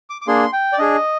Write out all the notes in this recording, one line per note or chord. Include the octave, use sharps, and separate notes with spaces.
D6
D6
A#3 D4 G#4 C6
G5
D5
D4 G#4 D#5